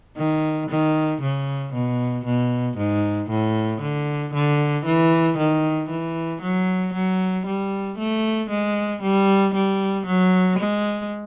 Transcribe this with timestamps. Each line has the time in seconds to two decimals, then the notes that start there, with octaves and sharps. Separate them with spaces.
0.16 D#3
0.70 D#3
1.22 C#3
1.73 B2
2.25 B2
2.78 G#2
3.30 A2
3.81 D3
4.34 D3
4.86 E3
5.38 D#3
5.89 E3
6.42 F#3
6.94 F#3
7.46 G3
7.98 A3
8.50 G#3
9.02 G3
9.54 G3
10.06 F#3
10.59 G#3